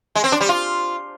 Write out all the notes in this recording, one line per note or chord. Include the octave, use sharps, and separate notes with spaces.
G#3
C4
D4
G3
F4